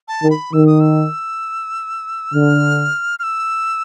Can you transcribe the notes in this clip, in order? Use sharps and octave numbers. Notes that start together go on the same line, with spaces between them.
A5
D#3
B5
D#3 E6
D#6
E6
D3 F6
F6
E6